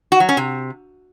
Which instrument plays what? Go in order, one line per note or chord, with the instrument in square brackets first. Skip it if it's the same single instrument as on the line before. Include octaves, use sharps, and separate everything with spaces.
[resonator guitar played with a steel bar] F#4
F#3
C#4
C3